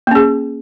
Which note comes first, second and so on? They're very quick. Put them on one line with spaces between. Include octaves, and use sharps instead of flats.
A#3 C#4 G#4